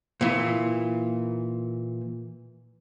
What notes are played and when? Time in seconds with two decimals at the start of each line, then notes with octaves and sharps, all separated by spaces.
0.21 A#2 E3